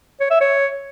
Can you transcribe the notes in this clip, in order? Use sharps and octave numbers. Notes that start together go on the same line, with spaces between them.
C#5
E5
C#5